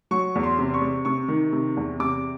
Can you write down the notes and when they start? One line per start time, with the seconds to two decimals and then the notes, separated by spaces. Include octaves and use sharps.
0.11 F#3 C#6
0.35 E2
0.43 C6
0.59 C3
0.74 C#6
0.82 C3
1.05 C3 C#6
1.28 D#3
1.53 C3
1.77 E2
2.00 C3 D6